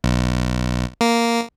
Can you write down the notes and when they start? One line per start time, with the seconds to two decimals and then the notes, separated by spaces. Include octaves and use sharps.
0.04 B1
1.01 A#3